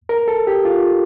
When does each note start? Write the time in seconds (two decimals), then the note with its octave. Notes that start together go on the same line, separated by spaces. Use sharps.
0.09 A#4
0.28 A4
0.47 G4
0.65 F4